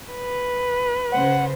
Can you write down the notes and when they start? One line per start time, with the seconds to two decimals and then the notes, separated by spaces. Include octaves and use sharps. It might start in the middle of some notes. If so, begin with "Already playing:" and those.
0.13 B4
1.12 C#3 C5 F#5